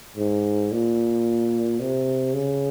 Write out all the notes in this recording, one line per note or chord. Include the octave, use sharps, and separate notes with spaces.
G#2
A#2
C3
C#3